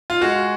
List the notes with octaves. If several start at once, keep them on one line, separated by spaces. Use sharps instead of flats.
F4
G#3 F#4